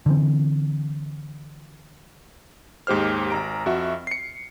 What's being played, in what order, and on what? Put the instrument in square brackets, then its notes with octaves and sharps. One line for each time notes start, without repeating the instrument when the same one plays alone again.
[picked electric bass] D3 E3 C4
[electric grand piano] D#2 G#2 G4 C5 F6
G#1 A#5 D7
F2 F#4 E5
C7 C#7